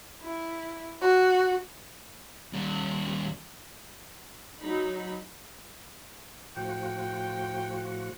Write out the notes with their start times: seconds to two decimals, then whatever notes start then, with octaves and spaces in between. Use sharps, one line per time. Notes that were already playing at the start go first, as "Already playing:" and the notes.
0.21 E4
1.01 F#4
2.53 D#2 G3
4.58 F#3 D#4 B5
6.57 A2 F3 F#4 G5